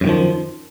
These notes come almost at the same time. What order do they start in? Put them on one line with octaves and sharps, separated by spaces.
F#2 A2 D#3 F3